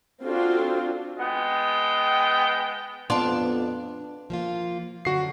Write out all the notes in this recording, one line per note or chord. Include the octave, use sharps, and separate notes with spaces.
C4 D4 F4 F#4 A4
G#3 B3 G5
F2 B3 D4 F4 D5 A5 C6
F3 A#3 F4
F#2 D3 F#4 C7